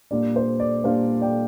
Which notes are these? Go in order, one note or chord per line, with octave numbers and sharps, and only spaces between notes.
A#2 G3 D4 D5
C5
D5
A#2 G3 D4 C5 F5
D5 G5